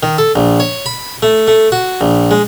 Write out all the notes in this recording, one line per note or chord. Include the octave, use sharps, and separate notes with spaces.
D#3
A4
A#1
C#5
B5
A3
A3
F#4
A#1
G#3